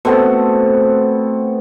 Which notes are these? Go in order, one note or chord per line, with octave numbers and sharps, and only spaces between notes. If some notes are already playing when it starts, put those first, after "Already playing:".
B2 A3 C4 A4